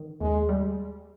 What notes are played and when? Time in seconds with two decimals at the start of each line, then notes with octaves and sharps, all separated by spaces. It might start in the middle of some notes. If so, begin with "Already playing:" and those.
Already playing: D#3
0.20 D#2 G#3
0.49 G3